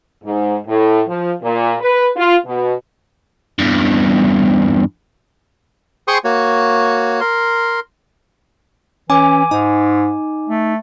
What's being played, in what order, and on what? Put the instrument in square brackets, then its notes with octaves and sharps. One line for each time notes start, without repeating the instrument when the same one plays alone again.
[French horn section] G#2
A2
F3
A#2
B4
F4
B2
[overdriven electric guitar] E2 G2
[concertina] G#4 C5 G5 C6 C#6 D#6
A#3 F#4 C#5
A#4 C6
[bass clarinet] E3 [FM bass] C#4 [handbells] G#5 D6
[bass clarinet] G#2 [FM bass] D#4
[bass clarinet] A3